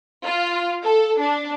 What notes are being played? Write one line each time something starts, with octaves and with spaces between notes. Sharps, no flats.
F4
A4
D4